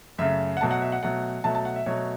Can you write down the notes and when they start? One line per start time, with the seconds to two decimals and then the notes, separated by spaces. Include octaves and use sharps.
0.19 F#2 C#3 A3 E5
0.57 F#5
0.61 B2 F#3 A3 A5
0.71 F#5
0.82 E5
0.92 F#5
1.03 B2 F#3 A3 F#5
1.44 B2 F#3 A3 A5
1.55 A5
1.65 F#5
1.76 E5
1.86 B2 F#3 A3 C#5